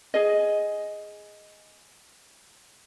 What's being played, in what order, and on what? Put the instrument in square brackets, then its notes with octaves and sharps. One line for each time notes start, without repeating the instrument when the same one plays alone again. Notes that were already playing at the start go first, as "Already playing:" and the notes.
[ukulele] G#4 D#5